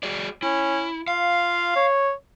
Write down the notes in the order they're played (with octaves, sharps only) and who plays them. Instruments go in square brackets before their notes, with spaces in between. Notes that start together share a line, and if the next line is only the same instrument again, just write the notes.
[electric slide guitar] F#4 G#4 D5
[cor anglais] C#4 [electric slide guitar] E4
[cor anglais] F4 [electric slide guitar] F5
[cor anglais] C#5